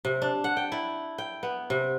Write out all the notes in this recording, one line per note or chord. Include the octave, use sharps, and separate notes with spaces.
C3
D4
F#5
G5
E4
G5
B3
C3